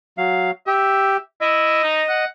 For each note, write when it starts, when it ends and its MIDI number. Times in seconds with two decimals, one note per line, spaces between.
0.18 0.51 54
0.18 0.51 77
0.67 1.17 67
0.67 1.18 76
1.41 1.82 64
1.41 2.25 75
1.84 2.02 63
2.09 2.27 78